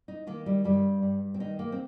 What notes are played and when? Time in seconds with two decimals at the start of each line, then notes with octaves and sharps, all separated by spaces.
0.08 D#4
0.27 D#3 A#3
0.46 G3
0.64 G2 G3
1.02 G2
1.34 C4
1.40 D#3 D#4
1.59 A#3
1.72 C4